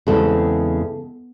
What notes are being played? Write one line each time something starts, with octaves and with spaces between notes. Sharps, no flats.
E2 C#3 G#3 C4 A4